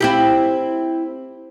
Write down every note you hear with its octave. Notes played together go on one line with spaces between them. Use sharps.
C4 E4 G4